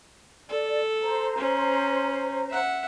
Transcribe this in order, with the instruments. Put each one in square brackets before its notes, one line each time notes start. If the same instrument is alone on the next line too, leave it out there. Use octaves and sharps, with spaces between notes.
[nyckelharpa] A4 [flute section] D5
[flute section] C5 A#5
[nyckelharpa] C#4
E5 F#5